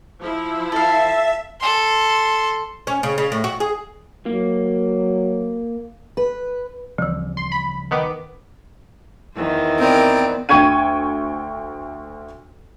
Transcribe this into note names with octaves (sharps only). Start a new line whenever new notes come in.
F3 E4
A4 E5 F5
A4 C6
C#4
C#3
C#3
A2
F#4
G#4
F#3 A#3
B4
D2 C#3 E3 F3 G3
C6
B5
D#3 B3 D6
E2 D#3 C5
B3 C4 A#4 D5
D2 G5 C#6 G#6 D#7